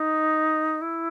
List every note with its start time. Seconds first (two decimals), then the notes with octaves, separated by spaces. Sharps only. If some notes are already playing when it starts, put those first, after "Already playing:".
Already playing: D#4
0.81 E4